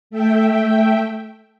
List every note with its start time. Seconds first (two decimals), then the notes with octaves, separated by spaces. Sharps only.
0.10 A3 E5 G5